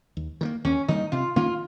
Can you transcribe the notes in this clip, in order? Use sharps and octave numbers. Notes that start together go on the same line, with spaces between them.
D#2
D#3 G3 A#3
D#2 C#4
D#3 G3 A#3 D#4
C3 F4
D#3 A#3 C#4 F4